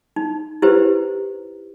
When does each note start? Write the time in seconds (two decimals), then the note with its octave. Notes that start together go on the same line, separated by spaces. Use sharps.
0.16 D#4
0.62 E4 G4 B4 C5